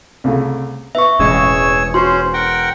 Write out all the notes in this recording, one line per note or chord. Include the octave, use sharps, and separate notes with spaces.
C2 C#3 A3
B3 E5 C#6
E1 A1 G#3 G#4 C#5 E6
C#4 F#4 C5 C6
A#4 F#5 G5